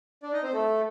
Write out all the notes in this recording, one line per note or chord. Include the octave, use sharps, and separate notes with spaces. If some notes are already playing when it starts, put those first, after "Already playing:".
D4 D5
D#4 D#5
C4 C5
A3 A4